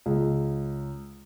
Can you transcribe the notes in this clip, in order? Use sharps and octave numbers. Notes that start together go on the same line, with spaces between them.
C#2